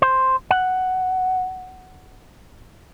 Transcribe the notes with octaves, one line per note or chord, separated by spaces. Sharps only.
C5
F#5